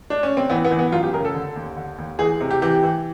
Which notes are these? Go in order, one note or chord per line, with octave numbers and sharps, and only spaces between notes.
D4
C#4
C4
E3 B3
B3
E3
B3
F#2 F4
G4
C#3 A#4
A4
D3
D#2
D3
D#2
E3 G#4
C3
G4
E3 G4
E3